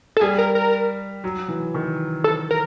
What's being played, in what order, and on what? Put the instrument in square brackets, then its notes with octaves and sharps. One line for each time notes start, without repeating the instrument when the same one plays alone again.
[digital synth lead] A4
[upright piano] G3 [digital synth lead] G#4
[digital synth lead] A#4
A#4
[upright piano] F#3
E3
D#3
[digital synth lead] A4
A#4